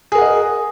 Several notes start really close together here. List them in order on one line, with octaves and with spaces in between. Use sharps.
G#4 A#4 F#5 D#5